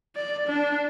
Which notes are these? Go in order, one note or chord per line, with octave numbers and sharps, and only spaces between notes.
D5
D4